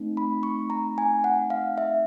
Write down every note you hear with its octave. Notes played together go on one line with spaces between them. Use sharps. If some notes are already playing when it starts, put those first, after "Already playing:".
Already playing: A3 C4 D#4
B5
C#6
A#5
G#5
F#5
F5
E5